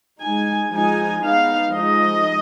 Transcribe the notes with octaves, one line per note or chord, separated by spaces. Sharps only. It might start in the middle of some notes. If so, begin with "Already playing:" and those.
G#3 D#4 G#5
F3 G#3 D#4 G#5
G#3 B3 D#4 F5
F3 G#3 D#4 D#5